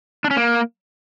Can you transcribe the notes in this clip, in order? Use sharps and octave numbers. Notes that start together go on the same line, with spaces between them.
D4
C#4
A#3